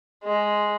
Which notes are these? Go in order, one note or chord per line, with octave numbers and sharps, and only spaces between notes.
G#3